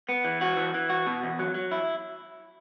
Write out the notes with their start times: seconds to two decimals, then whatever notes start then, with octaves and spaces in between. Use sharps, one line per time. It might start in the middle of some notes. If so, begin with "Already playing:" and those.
0.09 B3
0.25 E3
0.41 F#4
0.57 E3
0.74 E3
0.90 F#4
1.07 B2
1.23 E2
1.39 F#3
1.55 F#3
1.71 E4